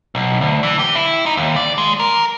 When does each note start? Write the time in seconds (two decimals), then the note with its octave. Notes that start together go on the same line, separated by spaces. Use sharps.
0.15 B1
0.41 D2
0.63 E3
0.79 G4
0.95 E4
1.26 D#4
1.37 D#2
1.56 D5
1.78 G#3
2.00 A#4